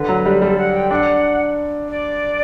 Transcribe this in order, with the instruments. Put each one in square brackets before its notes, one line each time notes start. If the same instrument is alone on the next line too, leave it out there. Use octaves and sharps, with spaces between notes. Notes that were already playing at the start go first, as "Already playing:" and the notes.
Already playing: [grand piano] D3 [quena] B4
[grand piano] F#3
G3
[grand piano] G3 [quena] A4
[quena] F#5
G5
[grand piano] D4 [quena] F#5 G5
[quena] D5